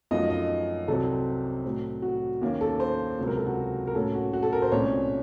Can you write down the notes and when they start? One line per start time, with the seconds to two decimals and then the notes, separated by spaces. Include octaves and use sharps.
0.11 F#2 F3 A3 D#4 D#5
0.30 D#5
0.88 C2 C3 F#3 C4 A4
1.65 A2 F#3 A3 C4
2.02 F#4
2.41 D#2 D#3 A#3 C#4
2.61 A4
2.80 C5
3.18 C#2 C3 F#3
3.28 A#4
3.37 A4
3.47 F#4
3.87 A#4
3.95 A2 F#3 A#3 C#4 A4
4.14 F#4
4.33 F#4
4.43 A4
4.53 A#4
4.62 C5
4.72 C2 A#2 A3 C#4 C#5